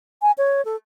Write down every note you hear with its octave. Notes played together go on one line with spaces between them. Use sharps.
G#5
C#5
A4